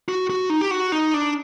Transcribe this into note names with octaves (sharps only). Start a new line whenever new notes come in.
F#4
F#4
D#4
G4
F#4
D#4
D4